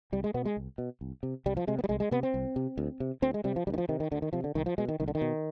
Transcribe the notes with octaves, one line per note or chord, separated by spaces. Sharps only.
C2 G3
G#3
B2 B3
G#3
C2
B2
C2
C3
C2 G3
F3
C3 G#3
B3
G3
C2 G#3
G#3
C3 B3
C4
C2
C3
D2
C3
D2 C4
G#3
C3 G3
F3
D2 G3
D#3
F3
C3 D#3
D#3
D2 D3
D#3
C3 F3
D3
C2 D#3
F3
B2 G#3
D#3
C2 D#3
D3
D#3
B2